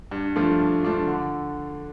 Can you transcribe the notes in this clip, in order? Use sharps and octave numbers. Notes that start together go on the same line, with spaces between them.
G2
F3 A3 D4 F4
G2
F3 A3 D4 F4
D3